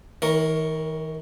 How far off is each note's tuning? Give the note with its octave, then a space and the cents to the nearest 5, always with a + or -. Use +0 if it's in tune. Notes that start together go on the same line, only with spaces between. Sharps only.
D#3 +45 A#4 +0 C#5 +0